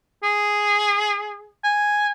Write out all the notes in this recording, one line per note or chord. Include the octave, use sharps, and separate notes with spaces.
G#4
G#5